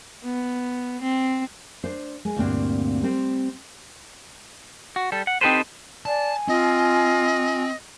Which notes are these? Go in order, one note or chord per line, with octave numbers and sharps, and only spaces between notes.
B3
C4
D4 C5
G#3
D2 G2 A#2 C4 D4
G3 C4 C5
F#4
G3 A4
F#5
C4 D#4 G4 A4 B4 C5
D5 G#5 A5
C4 F4 D#5